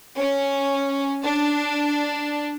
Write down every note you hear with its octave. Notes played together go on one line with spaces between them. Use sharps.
C#4
D4